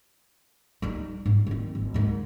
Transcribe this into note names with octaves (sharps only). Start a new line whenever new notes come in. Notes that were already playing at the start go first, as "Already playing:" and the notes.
G3 D#4
G#2
D#3 C4
G#1
G#2 D#3